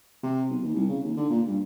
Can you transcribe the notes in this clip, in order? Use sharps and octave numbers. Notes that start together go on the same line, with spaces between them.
C3
B1
D#2
C2
C#3
D#2
D3
A#2
G2